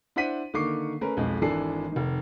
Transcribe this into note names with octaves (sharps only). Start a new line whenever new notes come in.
D4 E4 C5 F#5 B6 D#7
D3 D#3 A#3 C#6 D6 C7
A3 C#4 A#4 B4
B1 F2 G#3
G#1 E3 D4 A4 C7
F1 D#3